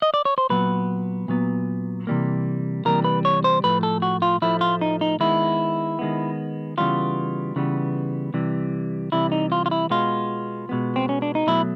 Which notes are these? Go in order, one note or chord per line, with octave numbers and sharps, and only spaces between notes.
D#5
D5
C#5
C5
A#2 F#3 B3 B4
A#2 F#3 B3
C3 E3 G3 A#3
C3 E3 G3 A#3 A#4
B4
C#5
C5
A2 F3 A3 B4
A4
F#4
F4
A2 F3 A3 E4
F4
D#4
D#4
D#3 G#3 B3 E4
D#3 G#3 B3
C#3 E3 G3 B3 F4
C#3 E3 G3 B3
C3 E3 G3
C3 E3 G3 E4
D#4
F4
F4
E4
B2 G#3 B3 F4
B2 G#3 B3
C4
C#4
D4
D#4
B2 F#3 A3 E4